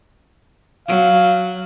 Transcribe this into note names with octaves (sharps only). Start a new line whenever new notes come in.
F#3 F5